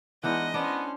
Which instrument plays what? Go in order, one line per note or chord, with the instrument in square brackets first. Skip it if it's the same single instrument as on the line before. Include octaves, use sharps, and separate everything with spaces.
[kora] E3 D4 D#4 [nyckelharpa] G#3 B3 [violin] D#5 [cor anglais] F#5
[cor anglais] B3 [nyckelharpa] C#4 C5 [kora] D4